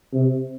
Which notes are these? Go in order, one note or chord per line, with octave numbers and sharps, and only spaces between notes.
C3